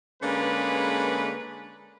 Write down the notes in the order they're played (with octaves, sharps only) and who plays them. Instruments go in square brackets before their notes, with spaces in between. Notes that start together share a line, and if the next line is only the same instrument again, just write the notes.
[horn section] D3 G#3 A#3 C#4 B4